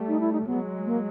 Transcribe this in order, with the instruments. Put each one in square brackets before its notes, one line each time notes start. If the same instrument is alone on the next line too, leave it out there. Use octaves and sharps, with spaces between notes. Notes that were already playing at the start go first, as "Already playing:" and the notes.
Already playing: [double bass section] G3 A3
[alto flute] D#4
E4
D#4
[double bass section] F#3 G#3 [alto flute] B3
[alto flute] A#3